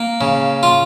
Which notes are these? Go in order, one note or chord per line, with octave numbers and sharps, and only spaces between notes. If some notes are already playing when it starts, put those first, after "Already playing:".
Already playing: A#3
C#3
F4